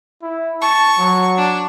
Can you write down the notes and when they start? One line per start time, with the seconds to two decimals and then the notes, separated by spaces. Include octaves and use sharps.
0.22 E4
0.62 A5 C#6
0.99 F#3
1.38 D4